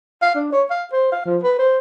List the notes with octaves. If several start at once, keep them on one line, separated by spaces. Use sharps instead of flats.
F5
D4
C#5
F5
C5
F5
F3
B4
C5